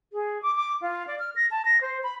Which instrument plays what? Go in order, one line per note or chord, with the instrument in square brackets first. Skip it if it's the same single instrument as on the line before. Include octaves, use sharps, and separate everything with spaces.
[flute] G#4
D6
D6
F4
D5
F6
A#6
A5
A#6
C5
B5